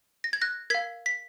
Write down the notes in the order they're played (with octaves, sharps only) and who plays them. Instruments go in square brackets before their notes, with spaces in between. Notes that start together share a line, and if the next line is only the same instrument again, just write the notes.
[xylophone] A#6
G#6
F#6 A#6
A#4 F5 G#6 B6
B6